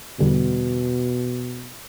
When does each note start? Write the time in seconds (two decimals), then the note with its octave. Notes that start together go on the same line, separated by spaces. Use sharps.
0.19 E2 B2 D3 G3